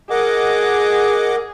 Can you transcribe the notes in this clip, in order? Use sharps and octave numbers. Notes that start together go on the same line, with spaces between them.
G#4 A#4 D#5 F#5 D6